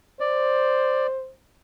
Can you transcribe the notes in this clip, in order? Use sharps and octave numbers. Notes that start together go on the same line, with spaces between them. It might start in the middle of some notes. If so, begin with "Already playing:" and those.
C5 D5